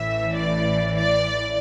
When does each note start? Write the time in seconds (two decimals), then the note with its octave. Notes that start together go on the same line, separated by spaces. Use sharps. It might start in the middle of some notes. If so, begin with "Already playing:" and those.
Already playing: A1 A2 E3 E5
0.34 D5
0.94 D5